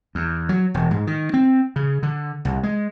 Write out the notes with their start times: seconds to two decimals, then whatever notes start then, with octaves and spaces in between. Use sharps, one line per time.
0.15 E2
0.49 F#3
0.74 E1
0.91 G#2
1.07 D#3
1.34 C4
1.76 C#3
2.03 D3
2.45 C2
2.63 G#3